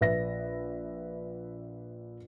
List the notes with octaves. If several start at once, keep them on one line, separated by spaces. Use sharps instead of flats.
A#1 B4 E5 A#6